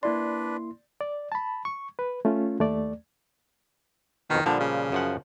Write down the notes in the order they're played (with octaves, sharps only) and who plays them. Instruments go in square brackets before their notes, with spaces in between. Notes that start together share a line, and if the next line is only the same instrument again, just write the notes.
[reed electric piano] A#3 E4 C6 [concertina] D4 B4 [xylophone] D5
[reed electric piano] D5
A5 B5
C#6
B4
A3 C#4 F4
D#2 A3 D5
[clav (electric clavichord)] F2 B2 [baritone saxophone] D#3
[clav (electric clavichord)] A#2 F3 G3 [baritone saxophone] D3
[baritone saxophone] C#3
[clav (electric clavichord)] F#2 F3 F#5